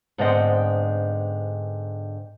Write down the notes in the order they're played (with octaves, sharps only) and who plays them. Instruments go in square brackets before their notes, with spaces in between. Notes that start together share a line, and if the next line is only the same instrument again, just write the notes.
[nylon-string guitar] G#2 D3 B3 C4 D#5 F#5